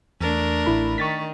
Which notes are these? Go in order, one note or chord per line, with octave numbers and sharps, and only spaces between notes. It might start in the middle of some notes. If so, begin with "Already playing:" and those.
E2 A3 D4 A#4
A1 E4 B5
D#3 C#6 A6 B6